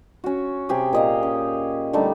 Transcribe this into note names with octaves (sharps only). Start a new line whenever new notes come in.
C#4 F#4
C3 G4 G#4
A#2 D#5 F5
C#4
D3 G3 A3 D#4